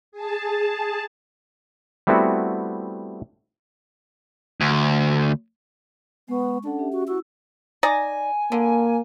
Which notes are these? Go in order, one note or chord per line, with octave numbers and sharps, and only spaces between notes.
G#4 A5
G3 A3 B3 C4 E4 F#4
D2
G#3 B3 C#6
C#4 D4 A4 F#5
C#4 G4 E5
F#4
E4 F#4 E6
D#4 D5 G#5 A#5
D3 A#3